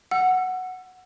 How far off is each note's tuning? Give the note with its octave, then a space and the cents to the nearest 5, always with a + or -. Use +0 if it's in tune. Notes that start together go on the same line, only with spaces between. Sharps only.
F#5 +0 E6 +30